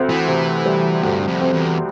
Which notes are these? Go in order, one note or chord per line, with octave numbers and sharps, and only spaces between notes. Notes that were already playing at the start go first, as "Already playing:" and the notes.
Already playing: D2 C4
E3
C3
G3
D2 G2
F2
C4
E2